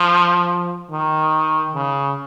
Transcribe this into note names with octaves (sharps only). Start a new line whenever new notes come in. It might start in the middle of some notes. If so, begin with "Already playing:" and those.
Already playing: F3
D#3
C#3